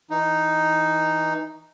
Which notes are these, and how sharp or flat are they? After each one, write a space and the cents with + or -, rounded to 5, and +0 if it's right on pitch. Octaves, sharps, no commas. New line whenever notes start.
E3 -15 D#4 +0